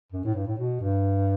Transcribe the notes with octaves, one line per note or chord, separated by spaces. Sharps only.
F#2
A2
G2
A2
B2
G2